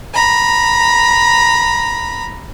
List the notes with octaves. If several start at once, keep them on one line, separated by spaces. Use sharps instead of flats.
A#5 B5